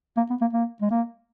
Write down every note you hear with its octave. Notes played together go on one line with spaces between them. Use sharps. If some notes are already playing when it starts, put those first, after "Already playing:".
A#3
B3
A#3
A#3
G#3
A#3